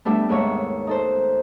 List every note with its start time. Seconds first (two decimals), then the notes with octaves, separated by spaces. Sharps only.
0.05 G3 A3 B3 D4 E5
0.29 D#2 G#2 A3 C#5 E6
0.87 D#4 A4 C5